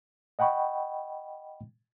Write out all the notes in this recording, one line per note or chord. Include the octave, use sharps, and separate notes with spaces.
D#5 F#5 G5 B5 C#6